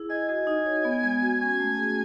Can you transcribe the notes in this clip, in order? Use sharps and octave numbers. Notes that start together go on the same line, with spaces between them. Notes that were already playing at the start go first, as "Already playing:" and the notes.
Already playing: E4 G#4
D#5 G#5
F#4 G#5
D#4
C#5
B3
G#3
F#4
C#4 G#5
A3
G#4